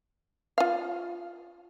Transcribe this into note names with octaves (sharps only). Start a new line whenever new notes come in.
F4 F5